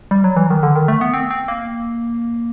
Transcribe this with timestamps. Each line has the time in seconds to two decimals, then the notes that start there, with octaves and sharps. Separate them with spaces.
0.11 G3
0.24 F#3
0.36 E3
0.50 D#3
0.63 D3
0.76 D#3
0.88 A3
1.01 B3
1.14 C4
1.31 C4
1.48 A#3